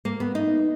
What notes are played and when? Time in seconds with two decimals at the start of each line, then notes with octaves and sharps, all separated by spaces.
0.05 A#3
0.20 B3
0.35 D#4